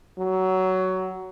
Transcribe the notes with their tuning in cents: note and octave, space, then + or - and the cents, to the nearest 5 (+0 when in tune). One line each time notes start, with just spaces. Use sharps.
F#3 +15